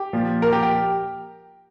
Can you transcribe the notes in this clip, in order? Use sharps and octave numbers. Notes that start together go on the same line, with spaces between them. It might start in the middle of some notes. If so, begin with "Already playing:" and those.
Already playing: G4
A#2 F3
A#4
G4
G4